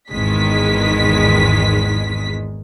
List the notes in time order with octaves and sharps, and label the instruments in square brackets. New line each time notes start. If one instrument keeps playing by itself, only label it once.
[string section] G#1 E2 D#3 G#3 B6